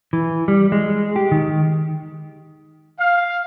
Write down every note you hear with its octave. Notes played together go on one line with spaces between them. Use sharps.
E3
G3
G#3
G4
D#3
F5